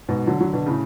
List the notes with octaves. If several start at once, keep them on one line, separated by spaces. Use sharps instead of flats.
G#2 B2
D3 F#3
D3 F#3
B2 D3
A2 C#3